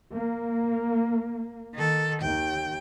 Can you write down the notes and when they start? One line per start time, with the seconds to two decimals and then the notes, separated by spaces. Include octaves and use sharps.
0.13 A#3
1.74 D#3 A4
2.22 D#2 G5